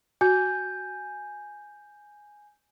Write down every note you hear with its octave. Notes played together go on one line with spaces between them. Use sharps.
F#4 G#5 G6